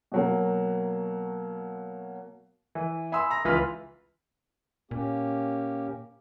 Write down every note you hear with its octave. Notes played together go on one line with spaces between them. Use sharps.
B2 F#3 A#3
E3
E5 G#5 B5 C6 D#6 E6
A#5 E6 A#6
C#2 E3 F4 B4 F6 B6
A#2 A#3 C#4 G4